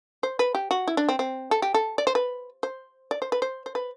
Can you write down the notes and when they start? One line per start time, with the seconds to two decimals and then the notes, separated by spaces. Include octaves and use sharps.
0.23 C5
0.39 B4
0.55 G4
0.71 F#4
0.88 E4
0.97 D4
1.09 C4
1.19 C4
1.51 A4
1.62 G4
1.74 A4
1.98 D5
2.07 C5
2.15 B4
2.63 C5
3.11 D5
3.22 C5
3.32 B4
3.42 C5
3.66 C5
3.75 B4